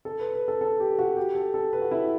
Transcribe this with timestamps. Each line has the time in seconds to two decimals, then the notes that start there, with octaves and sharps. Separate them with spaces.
0.05 A4
0.20 B4
0.34 B4
0.48 A4
0.61 A4
0.80 G4
0.99 F#4
1.17 G4
1.35 A4
1.54 A4
1.73 B4
1.82 F#4
1.91 E4